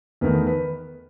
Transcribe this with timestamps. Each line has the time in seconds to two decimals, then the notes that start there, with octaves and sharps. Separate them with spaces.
0.21 E2 D#3 A3 B4
0.47 B4